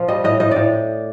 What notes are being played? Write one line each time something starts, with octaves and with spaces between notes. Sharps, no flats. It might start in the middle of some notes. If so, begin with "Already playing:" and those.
Already playing: A#2 F3 C5
G3 D#5
A2 D#5
A2 D#5
A2 D5